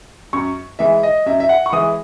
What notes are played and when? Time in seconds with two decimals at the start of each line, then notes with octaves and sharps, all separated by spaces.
0.33 F#2 C#6
0.79 E3 G#3 E5
1.03 D#5
1.26 F#2 E5
1.40 E5
1.49 F#5
1.66 C#6
1.72 E3 G#3 D#6